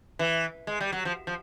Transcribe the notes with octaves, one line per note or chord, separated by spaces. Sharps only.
E3
G#3
G3
F#3
F3
F3